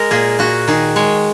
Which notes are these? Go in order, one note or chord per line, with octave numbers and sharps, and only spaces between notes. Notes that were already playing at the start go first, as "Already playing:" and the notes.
Already playing: G#3 A#4
A#2 G#4
A#2 F#4
D#3 G#4
G#3 C#5